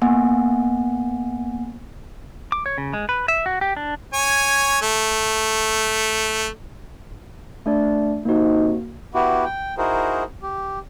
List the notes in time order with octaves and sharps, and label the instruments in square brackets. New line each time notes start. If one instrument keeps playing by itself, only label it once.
[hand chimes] A#3 B3 F#5 G#5
[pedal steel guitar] D6
C#5
C#3
G#3
B4
E5
F#4
G4
D4
[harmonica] C#5 G#5
A3
[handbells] A3 D4 D5
[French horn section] C3 C4 D#4 [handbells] A#3 F#4
[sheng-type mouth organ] B3 E4 F#4 G4
G5
D#4 E4 F#4 G#4 A#4 C5
G4